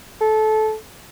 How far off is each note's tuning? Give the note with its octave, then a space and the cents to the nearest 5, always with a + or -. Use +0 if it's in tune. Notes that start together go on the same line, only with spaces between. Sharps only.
A4 -20